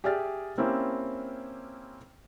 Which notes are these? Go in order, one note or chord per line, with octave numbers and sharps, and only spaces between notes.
G4 G#4 D5 E5 F6 A6
A#3 C4 C#4 E4 G4